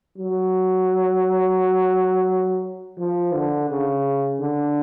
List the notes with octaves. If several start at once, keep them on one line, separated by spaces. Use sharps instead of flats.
F#3
F3
D3
C#3
D3